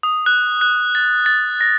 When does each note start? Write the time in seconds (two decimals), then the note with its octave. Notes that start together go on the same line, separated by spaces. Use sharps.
0.03 D#6
0.26 F#6
0.61 F#6
0.95 A6
1.26 A6
1.61 A#6